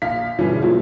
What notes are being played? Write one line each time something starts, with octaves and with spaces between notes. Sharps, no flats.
A#1 F5 B6
G1 B2 E3 G3 C#4 G#4
F3 F#3 A#3 E4